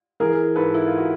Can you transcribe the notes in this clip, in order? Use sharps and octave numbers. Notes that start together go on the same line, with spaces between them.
E3 G#4 A#4
G#2 A4 B4
E4
F4
F#4